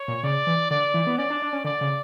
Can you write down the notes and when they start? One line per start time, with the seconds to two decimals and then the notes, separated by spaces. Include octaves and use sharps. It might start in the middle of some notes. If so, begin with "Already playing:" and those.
Already playing: C#5
0.08 A#2
0.23 C#3 D5
0.47 E3
0.71 D3 D5
0.94 E3
1.07 B3
1.18 C#4 D5
1.30 D4
1.42 D4
1.53 C#4
1.64 D3 D5
1.81 C#3